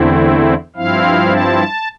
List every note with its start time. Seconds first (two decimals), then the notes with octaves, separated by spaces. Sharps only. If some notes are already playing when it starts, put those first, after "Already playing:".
Already playing: E2 D3 A3 C4 E4
0.76 G2 F3 C4 E4 F5
1.31 A5